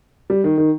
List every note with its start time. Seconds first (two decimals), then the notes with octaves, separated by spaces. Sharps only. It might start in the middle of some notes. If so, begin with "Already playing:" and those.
0.30 G3
0.44 D#3
0.58 D#3